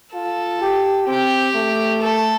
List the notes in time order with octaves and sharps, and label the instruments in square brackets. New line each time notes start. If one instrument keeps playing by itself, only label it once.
[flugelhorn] F4 [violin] A4
[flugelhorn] G4
[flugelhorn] C4 [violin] G4
[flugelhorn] A3
[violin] A4